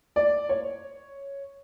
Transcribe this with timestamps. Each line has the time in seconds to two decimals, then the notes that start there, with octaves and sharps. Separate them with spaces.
0.16 D5
0.49 C#5